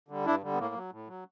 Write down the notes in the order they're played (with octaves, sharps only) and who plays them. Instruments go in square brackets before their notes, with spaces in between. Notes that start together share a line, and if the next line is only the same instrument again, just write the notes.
[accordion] D3 G3
G2 D4 E4
D3 G3
B3
A2 A#3
F#3
A2
F#3